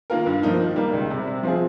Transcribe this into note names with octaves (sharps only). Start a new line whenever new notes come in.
D#3 A#3 F4 A#4
G2
F3 A#3 D#4
D#3
G3 A#3
C#2
C3 G3
C3
F3 C4 F4 G#4